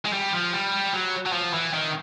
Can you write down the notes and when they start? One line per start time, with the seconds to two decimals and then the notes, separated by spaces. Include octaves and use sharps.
0.05 G#3
0.13 G3
0.32 F3
0.53 G3
0.93 F#3
1.26 F#3
1.33 F3
1.53 E3
1.73 D#3